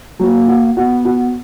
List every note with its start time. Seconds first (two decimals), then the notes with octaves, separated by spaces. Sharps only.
0.19 F#3 A#3
0.48 F#4
0.77 B3 F#4
1.05 F#4